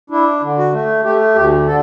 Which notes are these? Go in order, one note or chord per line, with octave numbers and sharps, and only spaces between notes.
D4 E4
D3
F#4
A3
A3 G4
D2 G4
D3 A4